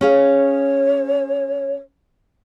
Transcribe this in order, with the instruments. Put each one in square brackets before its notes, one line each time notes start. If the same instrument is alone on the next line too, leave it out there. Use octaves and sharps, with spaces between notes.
[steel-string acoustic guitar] C#4 G#4 F5 [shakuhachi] C#5